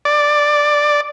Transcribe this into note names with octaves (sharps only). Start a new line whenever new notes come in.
D5